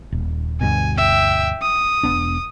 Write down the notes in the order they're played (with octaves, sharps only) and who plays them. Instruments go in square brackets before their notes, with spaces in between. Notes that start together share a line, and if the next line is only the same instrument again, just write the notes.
[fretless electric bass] D#1
[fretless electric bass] D2 G2 B2 [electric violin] G#5
[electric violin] E5 G5
D#6
[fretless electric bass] E1 B3 D4